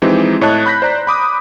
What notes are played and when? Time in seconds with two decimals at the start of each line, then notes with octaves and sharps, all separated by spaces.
0.02 E3 F3 G#3 C4 D#4 G4
0.41 A2 C#5 D#5 A5 F#6
0.66 B5 F#6 G6 A#6 B6
0.82 C5 D5 A#5
1.07 B5 D6 D#6